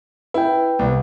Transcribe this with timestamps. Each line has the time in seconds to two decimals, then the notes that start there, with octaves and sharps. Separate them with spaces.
0.34 E4 B4 G5
0.79 C2